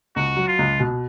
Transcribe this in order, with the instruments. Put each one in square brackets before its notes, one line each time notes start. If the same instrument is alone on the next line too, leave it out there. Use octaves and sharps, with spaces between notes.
[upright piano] C#2 [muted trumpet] F#4
[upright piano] F#3
[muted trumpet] F4
[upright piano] C#2
B2